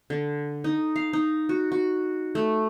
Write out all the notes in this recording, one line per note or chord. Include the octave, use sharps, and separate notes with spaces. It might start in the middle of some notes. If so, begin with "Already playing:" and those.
D3
D#4
F5
D#4
F#4
F#4
A3